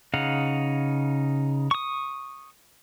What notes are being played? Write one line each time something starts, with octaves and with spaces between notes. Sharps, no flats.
C#3 D#4 F5 F#5
C#6 D#6